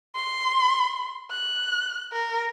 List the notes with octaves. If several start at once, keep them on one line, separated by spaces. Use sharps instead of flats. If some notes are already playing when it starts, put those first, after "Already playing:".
C6
F#6
A#4